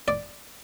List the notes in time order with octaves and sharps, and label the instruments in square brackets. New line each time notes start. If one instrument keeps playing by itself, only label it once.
[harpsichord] D5